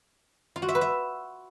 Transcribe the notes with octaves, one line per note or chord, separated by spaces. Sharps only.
F4
F#4
E5
B4
E5